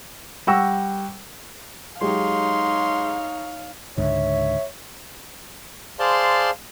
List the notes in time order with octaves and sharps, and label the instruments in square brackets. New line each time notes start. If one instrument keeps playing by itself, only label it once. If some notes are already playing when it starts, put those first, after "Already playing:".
[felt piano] G3 F#5 G5 C#6 E6 A#6
[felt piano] F#3 G#3 G4 [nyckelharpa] D#4 C#5 [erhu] F5 [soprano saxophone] C6
[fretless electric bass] C#2 G#2 D3 [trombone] C#5 [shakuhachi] E5
[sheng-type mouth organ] G#4 C5 D5 F5 A5 C6